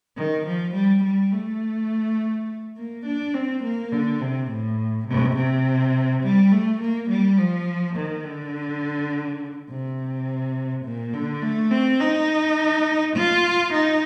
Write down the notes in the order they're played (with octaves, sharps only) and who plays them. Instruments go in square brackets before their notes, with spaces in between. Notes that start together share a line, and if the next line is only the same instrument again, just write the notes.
[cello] D#3
F3
G3
G3
A3
A#3
D4
C4
A#3
D3
C3
A2
C3
C3
G3
A3
A#3
G3
F3
D#3
D3
C3
A#2
D3
A3
C4
D#4
F4
D#4